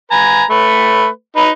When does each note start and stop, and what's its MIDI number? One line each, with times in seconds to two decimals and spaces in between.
0.11 0.43 71
0.11 0.43 80
0.11 0.43 82
0.50 1.07 57
0.50 1.07 71
1.36 1.50 63
1.36 1.50 71